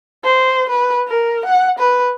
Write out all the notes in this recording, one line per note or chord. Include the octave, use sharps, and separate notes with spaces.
C5
B4
A#4
F#5
B4